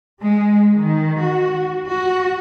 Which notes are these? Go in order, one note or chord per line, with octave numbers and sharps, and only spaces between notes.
G#3
D#3
F#4
F#4